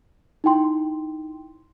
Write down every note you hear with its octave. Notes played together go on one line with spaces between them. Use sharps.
D#4 E4 G5 C6